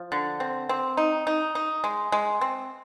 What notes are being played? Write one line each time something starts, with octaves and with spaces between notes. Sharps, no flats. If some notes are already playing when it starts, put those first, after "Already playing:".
Already playing: F3
D3
C4
C4
D#4
D#4
D#4
G#3
G#3
C4